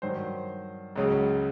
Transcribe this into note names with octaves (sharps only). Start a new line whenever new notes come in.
G2 D#3 F#3 C5
C#2 C#3 F#3